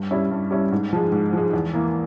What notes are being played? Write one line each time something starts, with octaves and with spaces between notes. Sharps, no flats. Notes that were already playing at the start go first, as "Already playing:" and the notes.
Already playing: G2
G3 C#4 E4
G2
G3 C#4 E4
G#2
F3 G#3
G#2
F3 G#3
E2
E3 A#3